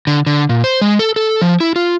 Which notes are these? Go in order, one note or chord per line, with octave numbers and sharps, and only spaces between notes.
D3
D3
A#2
C5
G#3
A4
A4
F3
E4
F4